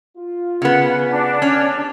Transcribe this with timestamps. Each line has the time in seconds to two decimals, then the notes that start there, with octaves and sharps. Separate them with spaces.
0.17 F4
0.62 C#3 B3 F#5
1.10 D4 G4 D5
1.42 C#4